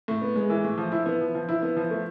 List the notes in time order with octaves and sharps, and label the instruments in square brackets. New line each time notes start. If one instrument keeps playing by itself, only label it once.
[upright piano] A2
B3
G#3
E3
A2
F3
E4
B3
F3
F3
E4
B3
F3
A3